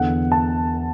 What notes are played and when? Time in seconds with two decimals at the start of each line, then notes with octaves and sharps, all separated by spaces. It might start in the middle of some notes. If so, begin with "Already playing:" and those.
Already playing: E2 D3 F#5
0.32 A5